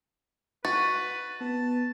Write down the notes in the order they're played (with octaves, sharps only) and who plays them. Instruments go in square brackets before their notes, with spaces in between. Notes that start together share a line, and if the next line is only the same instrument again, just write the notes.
[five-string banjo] F#4 [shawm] B4 [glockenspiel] A6
[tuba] B3 [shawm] A5